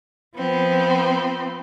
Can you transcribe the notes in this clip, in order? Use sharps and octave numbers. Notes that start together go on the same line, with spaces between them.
F3 B3 C4